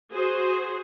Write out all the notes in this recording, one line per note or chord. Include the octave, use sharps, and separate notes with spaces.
F#4 G#4 C5